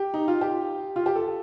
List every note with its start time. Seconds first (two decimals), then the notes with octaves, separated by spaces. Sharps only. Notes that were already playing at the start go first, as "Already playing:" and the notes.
Already playing: G4
0.14 D#4
0.28 F4
0.41 G4
0.96 F4
1.06 G4
1.16 A4